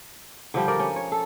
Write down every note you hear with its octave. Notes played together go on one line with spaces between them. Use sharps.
D3 F3 G3
A#4 D5
C#4
C#5
A4